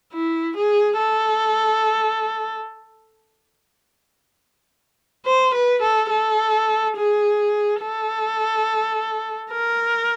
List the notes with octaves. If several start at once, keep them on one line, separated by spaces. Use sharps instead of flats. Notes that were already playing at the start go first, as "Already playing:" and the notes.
E4
G#4
A4
C5
B4
A4
A4
G#4
A4
A#4